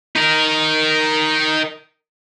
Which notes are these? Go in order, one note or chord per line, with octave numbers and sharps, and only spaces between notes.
D#4 A#4